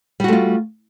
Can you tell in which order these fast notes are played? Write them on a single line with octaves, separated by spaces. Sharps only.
G3 F#4 A3 F4